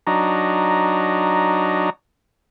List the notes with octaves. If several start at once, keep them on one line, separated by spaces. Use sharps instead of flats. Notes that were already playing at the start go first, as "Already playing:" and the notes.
F#3 D4 D#4 A#5